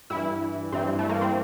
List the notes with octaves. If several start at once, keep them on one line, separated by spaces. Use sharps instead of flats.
G2 E3 E4
G2 E3 C4
A3
A#3
C4